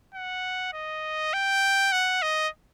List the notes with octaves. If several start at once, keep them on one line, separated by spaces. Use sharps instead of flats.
F#5
D#5
G5
F#5
D#5